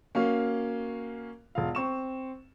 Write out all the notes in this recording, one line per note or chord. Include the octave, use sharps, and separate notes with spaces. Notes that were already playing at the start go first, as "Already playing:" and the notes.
A#3 C#4 F#4 F5
E1 F4 F5
C4 C#6 E7